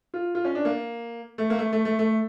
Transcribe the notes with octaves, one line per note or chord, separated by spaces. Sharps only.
F4
F4
C#4
D4
A#3
A3
A#3
A3
A3
A3
A3